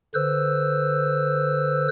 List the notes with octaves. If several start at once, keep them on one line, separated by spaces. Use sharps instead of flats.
D3 B4 C5 E6